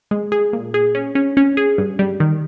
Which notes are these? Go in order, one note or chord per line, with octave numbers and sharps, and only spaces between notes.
G#3
G#4
A#2
G#4
C#4
C#4
C#4
G#4
G2
G3
D#3